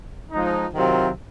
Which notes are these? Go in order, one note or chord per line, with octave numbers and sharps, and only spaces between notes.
F3 G#3 D#4
C3 D#3 F#3 C4 F4